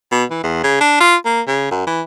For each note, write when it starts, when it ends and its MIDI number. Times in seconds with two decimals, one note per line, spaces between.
0.12 0.24 47
0.31 0.41 52
0.43 0.63 40
0.64 0.80 49
0.81 0.96 62
1.00 1.16 65
1.25 1.41 58
1.47 1.70 49
1.71 1.86 42
1.87 2.01 52